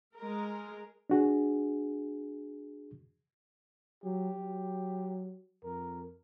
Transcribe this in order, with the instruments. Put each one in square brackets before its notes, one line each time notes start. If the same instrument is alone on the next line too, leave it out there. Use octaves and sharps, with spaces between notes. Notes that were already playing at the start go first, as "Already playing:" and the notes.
[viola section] G#3 A#4
[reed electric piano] D4 F#4 G#4
[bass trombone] F#3 [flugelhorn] G4
[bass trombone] F#3
[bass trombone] F2 [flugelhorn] A#4